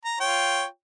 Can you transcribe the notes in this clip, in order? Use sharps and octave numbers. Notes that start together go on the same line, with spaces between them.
A#5
F4 C#5 G5